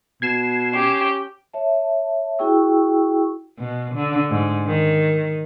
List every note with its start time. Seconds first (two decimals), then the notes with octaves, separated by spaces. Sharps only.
0.22 B2 G#6 C7 E7
0.73 C#4 G4
1.53 C#5 E5 A5
2.39 E4 F#4 G#4 G5 C#6 E6
3.59 B2
3.95 D3
4.30 G#2
4.66 D#3